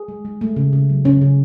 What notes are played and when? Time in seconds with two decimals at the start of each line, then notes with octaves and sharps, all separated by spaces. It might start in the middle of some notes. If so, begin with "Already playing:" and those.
Already playing: G#4
0.08 G#3
0.25 G#3
0.41 A3
0.56 C#3
0.73 C#3
0.90 F#3
1.05 C#3 C#4
1.21 C#3